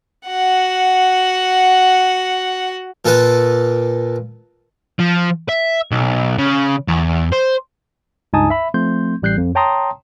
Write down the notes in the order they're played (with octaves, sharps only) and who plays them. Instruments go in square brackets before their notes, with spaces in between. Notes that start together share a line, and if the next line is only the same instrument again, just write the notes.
[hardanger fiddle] F#4 F#5
[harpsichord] A#2 F4 A4 B4 A5
[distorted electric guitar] F3
E5
B1
C#3
E2
C5
[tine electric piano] C#2 G2 D#4 G#5 A5 D#6
E5 B5
F3 A3 C4 C6 G6
A1 G3 F#6 G6 C7
F2
C#5 G5 A5 A#5 C6 D#6